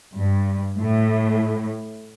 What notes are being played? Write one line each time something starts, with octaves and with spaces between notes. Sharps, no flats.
G2
A2